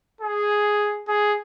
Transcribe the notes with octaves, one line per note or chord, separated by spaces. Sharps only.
G#4
G#4